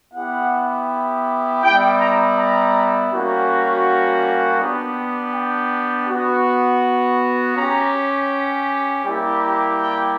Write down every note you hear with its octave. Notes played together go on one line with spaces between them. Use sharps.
B3 E4 G4 F#5
G3 B3 E4 G5
A#5
A#5
G3 A#3 C#4 F#4
B3 D4 G4
G5
B3 F#4
C#4 G4 A#5
G3 A#3 E4 G4
G5